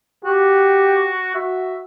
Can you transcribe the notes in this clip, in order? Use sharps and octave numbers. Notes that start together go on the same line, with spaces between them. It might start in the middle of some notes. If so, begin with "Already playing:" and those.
F#4 G4
F#4 E5